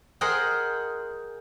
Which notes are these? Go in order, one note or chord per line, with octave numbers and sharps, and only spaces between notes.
G#4 A#4 C5 D#5 F#5 G5